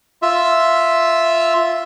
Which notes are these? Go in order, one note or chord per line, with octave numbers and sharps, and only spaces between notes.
F4 E5